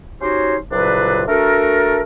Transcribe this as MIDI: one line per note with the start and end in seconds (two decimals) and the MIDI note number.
0.22 0.57 61
0.22 0.57 63
0.22 0.57 66
0.22 0.57 67
0.22 0.57 72
0.22 0.57 73
0.71 1.24 36
0.71 1.24 46
0.71 1.24 49
0.71 1.24 54
0.71 1.24 62
0.71 1.24 71
1.28 2.02 57
1.28 2.02 62
1.28 2.02 66
1.28 2.02 69
1.28 2.02 70